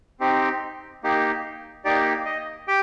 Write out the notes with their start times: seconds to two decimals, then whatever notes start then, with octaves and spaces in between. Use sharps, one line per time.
0.20 C4 D#4 G4
1.03 A#3 D#4 G4
1.85 A#3 D#4 G4 D5
2.25 D#5
2.68 G4 G5